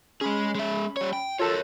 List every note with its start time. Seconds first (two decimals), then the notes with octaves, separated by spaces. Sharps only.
0.21 G#3 C#4 G#4 B5
0.55 G#3 E5
0.97 G3 C#5
1.13 G5
1.39 F4 A4 A#4 C#5 A5